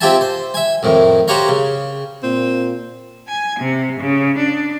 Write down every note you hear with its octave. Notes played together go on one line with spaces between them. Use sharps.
C4 F4 G4 E5 G#5 A5
C5
E5 G#5
F2 A2 D#3
F#4 G4 C5 C#5 F5 A#5
C#3
A#2 C4
G#5
C3
C#3
D4